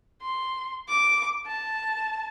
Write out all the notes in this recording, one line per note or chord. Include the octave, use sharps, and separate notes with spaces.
C6
D6
A5